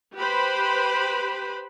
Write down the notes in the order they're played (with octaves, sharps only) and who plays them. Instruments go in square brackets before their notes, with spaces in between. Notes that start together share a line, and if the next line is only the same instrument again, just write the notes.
[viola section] G4 B4 C5 B5